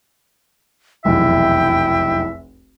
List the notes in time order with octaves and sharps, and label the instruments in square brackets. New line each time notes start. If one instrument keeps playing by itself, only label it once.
[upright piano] F1 B1 E2 [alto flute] E4 [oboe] E5 [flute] G5